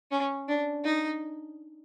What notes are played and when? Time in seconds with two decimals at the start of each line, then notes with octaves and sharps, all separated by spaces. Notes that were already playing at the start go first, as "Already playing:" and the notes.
0.11 C#4
0.48 D4
0.85 D#4